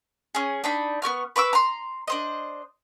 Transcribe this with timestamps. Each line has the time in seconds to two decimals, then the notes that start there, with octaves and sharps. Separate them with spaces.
0.35 C#4 G#4
0.64 D4 D#4 B5
1.02 B3 G4 C#6 F6
1.36 B4 C#6 D6 E6
1.53 A#5 C6
2.08 D4 C5 D#5